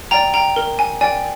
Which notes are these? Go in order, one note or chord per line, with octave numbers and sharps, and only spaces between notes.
D5 G5 A#5
G5 A#5
A#4
G#5
D5 G5 G#5